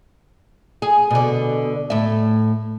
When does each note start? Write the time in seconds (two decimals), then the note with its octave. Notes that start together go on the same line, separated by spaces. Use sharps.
0.82 G#4
1.11 B2 D3
1.90 A2 E5